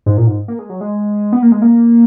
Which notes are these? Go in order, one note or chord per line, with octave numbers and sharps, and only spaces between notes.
G#2
A#2
G#2
A#3
G#3
F#3
G#3
B3
A#3
G#3
A#3